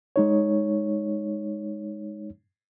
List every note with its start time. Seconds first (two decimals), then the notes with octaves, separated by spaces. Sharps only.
0.16 G#3 D#4 C#5